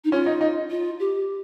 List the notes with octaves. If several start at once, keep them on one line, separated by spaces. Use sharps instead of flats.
D#4
C#4 F4
D#4
D#4
F4
G4